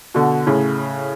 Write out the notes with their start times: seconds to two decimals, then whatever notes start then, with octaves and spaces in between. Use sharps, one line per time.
0.14 B2 D3
0.47 A2 C#3